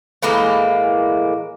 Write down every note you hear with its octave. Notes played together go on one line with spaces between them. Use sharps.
A2 E3 G#3 A#3